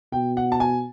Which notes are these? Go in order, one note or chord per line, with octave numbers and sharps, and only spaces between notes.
B2 G5
F#5
A5
G#5